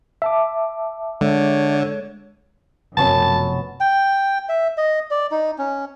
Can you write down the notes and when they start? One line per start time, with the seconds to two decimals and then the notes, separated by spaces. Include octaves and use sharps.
0.22 E5 A5 D6
1.21 D3 G#3 C#5
2.97 F1 F#2 B2 B3 C#4 F#4 A5
3.80 G5
4.49 E5
4.77 D#5
5.11 D5
5.31 D#4
5.58 C#4